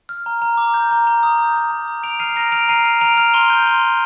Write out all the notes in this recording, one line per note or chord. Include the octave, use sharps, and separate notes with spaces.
F6
A#5
A#5
D6
G6
A#5
A#5
D#6
G6
A#5
A#5
D#6
A#5 D7 F7
F6 C7 D#7
A#5 A#6 D7
F6 D7 F7
A#5 C7 D#7
F6
A#5 D7 F7
F6
C6 D#7 G7
G6
C6
G6